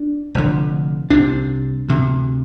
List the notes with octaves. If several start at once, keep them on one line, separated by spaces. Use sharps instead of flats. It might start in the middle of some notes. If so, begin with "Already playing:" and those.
Already playing: D4
F1 F2 D3
C2 C3 D4
D2 C3